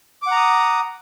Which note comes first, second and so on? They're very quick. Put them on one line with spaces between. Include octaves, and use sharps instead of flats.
D6 F#5 A#5 D#6